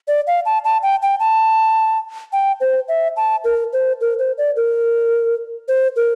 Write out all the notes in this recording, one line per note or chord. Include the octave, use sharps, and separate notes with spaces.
D5
F5
A5
A5
G5
G5
A5
G5
C5
E5
A5
A#4
C5
A#4
C5
D5
A#4
C5
A#4